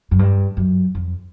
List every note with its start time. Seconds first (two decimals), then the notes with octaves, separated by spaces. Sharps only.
0.11 F#2
0.19 G2
0.57 F#2
0.95 F2